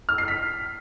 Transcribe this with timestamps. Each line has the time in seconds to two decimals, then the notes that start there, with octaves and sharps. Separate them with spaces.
0.09 F6
0.18 C7
0.28 B6